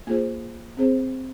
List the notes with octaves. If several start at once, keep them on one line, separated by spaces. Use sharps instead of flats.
A#3 F4 G#4 C5
C4 G#4 C5